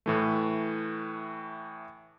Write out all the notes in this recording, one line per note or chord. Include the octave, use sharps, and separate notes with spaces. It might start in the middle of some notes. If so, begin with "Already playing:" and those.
A2 E3 A3